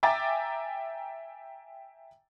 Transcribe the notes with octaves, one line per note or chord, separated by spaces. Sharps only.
E5 G5 G#5 A#5 D6 A6